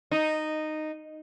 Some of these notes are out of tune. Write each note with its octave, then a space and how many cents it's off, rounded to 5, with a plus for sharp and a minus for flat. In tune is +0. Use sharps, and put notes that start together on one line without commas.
D#4 -10